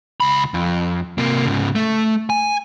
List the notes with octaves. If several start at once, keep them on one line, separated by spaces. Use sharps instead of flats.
C#2 B5
F2
C3 A#3
G#2 C#3
A3
G#5